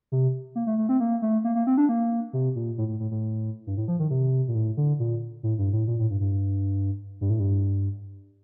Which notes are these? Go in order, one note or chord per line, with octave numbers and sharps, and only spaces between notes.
C3
A#3
A3
A3
C4
A#3
A3
A#3
A#3
C4
D4
A#3
C3
A#2
A2
A2
A2
A2
G2
A2
F3
D#3
C3
A#2
A2
D3
A#2
A2
G2
A2
A#2
A2
G2
G2
G2
A2
G2